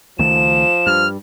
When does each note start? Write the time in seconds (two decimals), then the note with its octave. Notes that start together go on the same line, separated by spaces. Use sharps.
0.19 C#2 D#3 F3 A3 E7
0.87 G2 F6